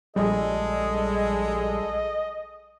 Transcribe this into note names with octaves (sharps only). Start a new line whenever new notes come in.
A#1 G3 G#3 G#4 A4 D#5